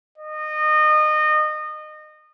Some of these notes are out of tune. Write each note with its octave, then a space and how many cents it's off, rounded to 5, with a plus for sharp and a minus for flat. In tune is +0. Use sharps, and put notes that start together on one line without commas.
D#5 -25